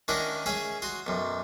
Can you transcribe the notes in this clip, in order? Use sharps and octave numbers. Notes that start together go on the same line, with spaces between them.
D#3 C#4 D4 E4 A#4 F#5
C#4 G#4 E5 G#5
F#4 C6 D#6
B1 F#2